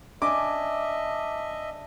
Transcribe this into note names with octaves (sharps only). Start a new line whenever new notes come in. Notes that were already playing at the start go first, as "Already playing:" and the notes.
D4 D#5 E5 G#5 D6